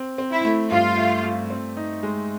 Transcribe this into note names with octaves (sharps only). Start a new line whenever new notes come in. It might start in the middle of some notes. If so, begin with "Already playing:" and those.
Already playing: C4
C4
E4
A3
G2 F4
A3
A3
C4
D#4
G#3